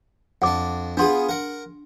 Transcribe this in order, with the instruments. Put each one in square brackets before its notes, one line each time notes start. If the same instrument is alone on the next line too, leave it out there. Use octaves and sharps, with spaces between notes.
[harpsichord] F2 D4 [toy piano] F#5 D6
[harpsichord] B3 F4 G#4 [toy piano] D4 C6
[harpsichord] A#4 F#5